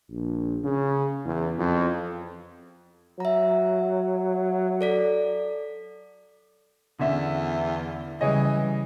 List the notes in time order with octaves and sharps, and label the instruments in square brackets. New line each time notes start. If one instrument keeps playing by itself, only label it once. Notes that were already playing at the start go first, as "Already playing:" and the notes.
[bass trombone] A#1
C#3
E2
F2
[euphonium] F#3 [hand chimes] E5 A#5
[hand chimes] A4 D5 B6
[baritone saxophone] E2 [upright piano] D3 C#4 E5
[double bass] C#3 G3 [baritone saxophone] E3 [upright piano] G#4 C#5 D#5